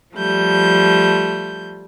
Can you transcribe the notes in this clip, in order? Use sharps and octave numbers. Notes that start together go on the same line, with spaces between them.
F3 G3 A3 G6